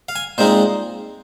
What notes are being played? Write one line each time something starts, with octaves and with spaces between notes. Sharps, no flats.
F5
G#5
A#2 G#3 C4 D#4 C5